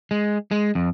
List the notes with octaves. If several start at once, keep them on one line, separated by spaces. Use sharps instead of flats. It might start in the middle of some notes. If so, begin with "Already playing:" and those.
G#3
G#3
F2